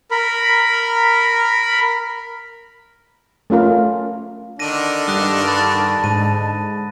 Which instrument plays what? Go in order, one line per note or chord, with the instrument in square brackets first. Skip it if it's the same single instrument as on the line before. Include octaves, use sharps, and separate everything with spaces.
[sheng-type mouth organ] A#4 B5
[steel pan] A3 C#4 F4 A#4
[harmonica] D3 D#3 D4 [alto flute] D#5 [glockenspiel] A#6 D#7
[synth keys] G2 [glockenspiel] D#6 F#6 A#6
[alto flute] A5 [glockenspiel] B5 F#6 A6
[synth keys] G#2 D3 [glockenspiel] D#7